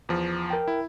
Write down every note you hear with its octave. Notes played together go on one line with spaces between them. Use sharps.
E2 F3
A#4 G5
E4